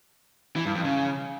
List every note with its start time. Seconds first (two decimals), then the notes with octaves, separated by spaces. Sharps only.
0.56 E3
0.65 G2
0.75 F2
0.84 C#3